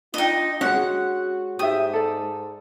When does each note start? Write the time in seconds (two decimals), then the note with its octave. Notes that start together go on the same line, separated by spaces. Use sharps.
0.14 D4 D#4 F4 D#5 G5
0.61 G#3 C#4 F#4 F#5
1.59 G#2 G4 E5 D#6
1.93 A4 D5